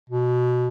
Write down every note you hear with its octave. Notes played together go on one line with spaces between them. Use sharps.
B2